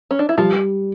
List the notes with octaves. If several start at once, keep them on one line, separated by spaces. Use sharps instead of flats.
C#4
D4
E4
F3 G3 F4